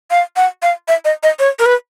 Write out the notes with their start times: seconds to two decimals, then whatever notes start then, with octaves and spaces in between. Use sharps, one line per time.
0.11 F5
0.36 F#5
0.62 F5
0.88 E5
1.05 D#5
1.23 D#5
1.39 C#5
1.59 A#4
1.66 B4